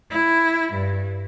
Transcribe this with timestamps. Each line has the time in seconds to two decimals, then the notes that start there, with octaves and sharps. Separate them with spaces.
0.10 E4
0.73 G2